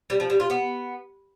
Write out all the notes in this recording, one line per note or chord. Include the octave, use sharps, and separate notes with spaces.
G3
F3
G3
F4
B3